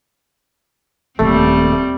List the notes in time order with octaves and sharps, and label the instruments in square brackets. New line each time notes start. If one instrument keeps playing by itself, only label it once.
[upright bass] D#1 A#3 [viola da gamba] G3 C4 [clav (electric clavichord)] A3